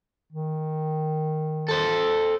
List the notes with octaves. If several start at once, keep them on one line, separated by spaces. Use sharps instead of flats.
D#3
A4 C5